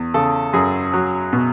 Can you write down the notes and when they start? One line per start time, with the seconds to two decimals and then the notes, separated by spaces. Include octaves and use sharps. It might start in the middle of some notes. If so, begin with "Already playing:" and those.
Already playing: E2
0.14 C#3 A4
0.53 F#2 G#4
0.93 F#3
1.33 B2